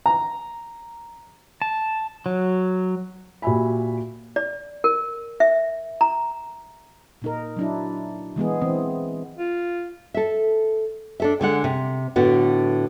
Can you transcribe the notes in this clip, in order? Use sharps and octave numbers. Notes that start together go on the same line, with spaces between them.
A#5
A5
F#3
A#2 F#4 G4 E5 G#5 B5
D5
A#4
E5
A#5
A#2 D#4 A#4
F#3 D4 E4
E3 G#3 B3 G#4
E3 C4
F4
A4 E5
D4 A4 E5
D3 G#3 F#5
C3
A2 D3 B3 F#4